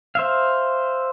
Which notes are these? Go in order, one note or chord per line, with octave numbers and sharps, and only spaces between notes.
C5 E5 F5